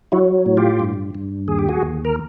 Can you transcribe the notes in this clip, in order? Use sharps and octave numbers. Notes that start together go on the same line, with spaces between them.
F#3 E4 F#4
A2
F4 G4
G2
G2
D#2 G#4
G4
F#4 G#4
D#2
A#4